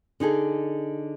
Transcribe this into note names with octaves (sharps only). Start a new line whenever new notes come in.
D3 D#4 G#4 A4